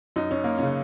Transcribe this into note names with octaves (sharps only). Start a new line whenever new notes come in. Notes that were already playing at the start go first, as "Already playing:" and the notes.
F#2 D#4
C#4
A#3
C#3 C#4